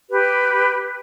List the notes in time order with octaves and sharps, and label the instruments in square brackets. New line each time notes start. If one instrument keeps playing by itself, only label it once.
[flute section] G4 B4